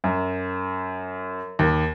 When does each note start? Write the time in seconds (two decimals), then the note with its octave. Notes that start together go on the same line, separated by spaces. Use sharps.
0.04 F#2
1.59 D#2